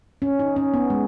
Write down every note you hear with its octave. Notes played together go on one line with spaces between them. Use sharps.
C#4
D#4
C#4
B3
G#3